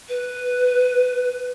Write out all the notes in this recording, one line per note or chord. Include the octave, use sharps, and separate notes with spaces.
B4